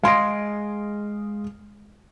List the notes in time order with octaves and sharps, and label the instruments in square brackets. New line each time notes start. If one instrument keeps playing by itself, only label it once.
[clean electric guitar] G#3 G#4 D#5 [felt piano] F5 C6 D7